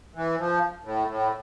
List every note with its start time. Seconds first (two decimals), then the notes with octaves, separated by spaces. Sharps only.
0.15 E3
0.39 F3
0.84 A2
1.07 A2